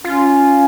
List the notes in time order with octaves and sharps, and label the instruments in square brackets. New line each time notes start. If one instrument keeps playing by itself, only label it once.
[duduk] C#4 [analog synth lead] F4